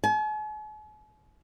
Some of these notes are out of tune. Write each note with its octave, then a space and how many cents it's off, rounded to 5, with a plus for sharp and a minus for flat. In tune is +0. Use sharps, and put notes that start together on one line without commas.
G#5 +45